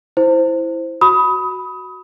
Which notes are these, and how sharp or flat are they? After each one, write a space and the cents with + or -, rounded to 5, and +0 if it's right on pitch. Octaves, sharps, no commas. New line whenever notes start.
E4 +0 C5 +0
F#4 +0 B5 +0 D#6 +25